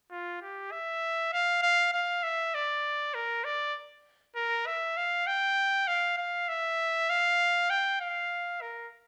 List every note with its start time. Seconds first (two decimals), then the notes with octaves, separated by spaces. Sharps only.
0.11 F4
0.42 G4
0.71 E5
1.33 F5
1.62 F5
1.93 F5
2.23 E5
2.54 D5
3.14 A#4
3.44 D5
4.35 A#4
4.66 E5
4.97 F5
5.27 G5
5.87 F5
6.18 F5
6.49 E5
7.10 F5
7.70 G5
8.00 F5
8.61 A#4